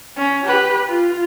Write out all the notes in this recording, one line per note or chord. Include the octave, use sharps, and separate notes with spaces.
C#4
G4 B4
F4